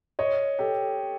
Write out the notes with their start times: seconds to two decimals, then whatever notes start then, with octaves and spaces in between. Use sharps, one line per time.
0.19 C#5 D#5
0.59 G4 A4